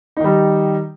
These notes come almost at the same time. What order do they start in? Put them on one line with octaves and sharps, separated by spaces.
D#4 D#3 G3